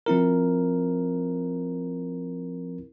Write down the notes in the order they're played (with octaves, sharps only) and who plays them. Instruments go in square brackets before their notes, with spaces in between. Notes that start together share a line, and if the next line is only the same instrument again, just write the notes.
[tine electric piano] F3 C4 E4 A#4